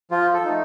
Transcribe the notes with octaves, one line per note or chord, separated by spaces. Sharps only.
F3 F4
A4
A3 D#4